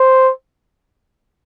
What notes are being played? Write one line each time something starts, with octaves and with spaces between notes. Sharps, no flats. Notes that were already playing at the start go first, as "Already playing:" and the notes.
Already playing: C5